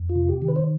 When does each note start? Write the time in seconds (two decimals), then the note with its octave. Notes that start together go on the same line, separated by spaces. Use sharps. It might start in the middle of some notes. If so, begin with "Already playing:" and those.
Already playing: F2
0.09 F4
0.16 C3
0.29 G4
0.42 D#3
0.48 B4
0.56 C5